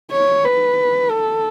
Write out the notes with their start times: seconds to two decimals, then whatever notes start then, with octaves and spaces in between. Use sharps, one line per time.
0.11 C#5
0.45 B4
1.11 A4